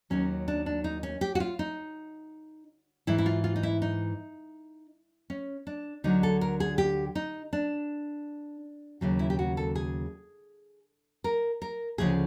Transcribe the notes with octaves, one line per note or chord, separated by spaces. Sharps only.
D#2 D#3 F#3 C#4
D4
D4
D#4
C#4
G4
F#4
F4
D#4
G#2 E3 E4
E4
F4
F4
D#4
E4
D#4
C#4
D4
D2 D3 F#3 D#4
A4
A#4
G#4
G4
D#4
D4
D#2 C#3 F#3
E4
G4
F#4
A4
G#4
A#4
A#4
D2 C#3 F3 G#4